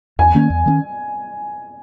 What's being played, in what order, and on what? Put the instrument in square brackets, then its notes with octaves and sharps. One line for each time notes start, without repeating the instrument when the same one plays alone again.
[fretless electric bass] E2 [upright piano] G#5
[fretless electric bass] D#3 A#3 C#4
E2
D#3 A#3 C#4